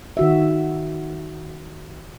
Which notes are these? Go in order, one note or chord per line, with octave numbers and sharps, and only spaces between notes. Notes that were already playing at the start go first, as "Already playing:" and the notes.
D#3 F#4 E5